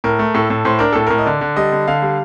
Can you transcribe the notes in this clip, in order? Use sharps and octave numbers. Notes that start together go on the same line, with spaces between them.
A2 A#4
A3
A2 A4
A2
A2 C5
D4 A#4
A2 A4
A2 A#4
D#5
D3 D5
D3
G3 D#5
D3
D3 F5
G3